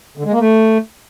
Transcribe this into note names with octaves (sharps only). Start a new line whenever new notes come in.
D3
G#3
A#3
A3